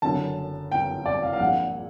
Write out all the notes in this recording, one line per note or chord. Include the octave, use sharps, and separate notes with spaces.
F#1 F#2 D3 A5
G5
D5
F5
F5
A#1 A#2 F#5